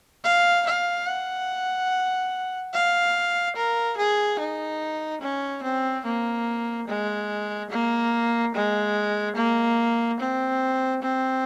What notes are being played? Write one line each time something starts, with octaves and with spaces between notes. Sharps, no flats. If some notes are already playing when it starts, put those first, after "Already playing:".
F5
F5
F#5
F5
A#4
G#4
D#4
C#4
C4
A#3
G#3
A#3
G#3
A#3
C4
C4